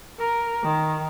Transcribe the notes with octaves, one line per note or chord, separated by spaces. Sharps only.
A#4
D#3